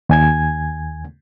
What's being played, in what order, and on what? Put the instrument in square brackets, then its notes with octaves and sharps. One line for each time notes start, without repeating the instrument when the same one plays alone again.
[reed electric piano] D#2 G#5 G#6